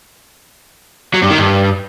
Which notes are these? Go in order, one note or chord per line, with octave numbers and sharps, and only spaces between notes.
F#3
G2
D#3
G2